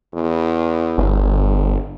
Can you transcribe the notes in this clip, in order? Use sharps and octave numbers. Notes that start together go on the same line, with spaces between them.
E2
G1